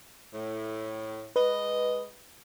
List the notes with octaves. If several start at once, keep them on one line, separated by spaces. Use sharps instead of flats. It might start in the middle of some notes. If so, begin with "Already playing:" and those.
A2
G#3 B4 D#5